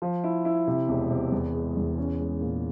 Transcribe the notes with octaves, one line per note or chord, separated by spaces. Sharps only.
F3
E4
E4
C3
E1
C3
E2
G#3
E2
C#4
G#3
A#2